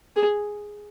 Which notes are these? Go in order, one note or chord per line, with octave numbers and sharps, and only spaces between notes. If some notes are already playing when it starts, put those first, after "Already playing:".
G#4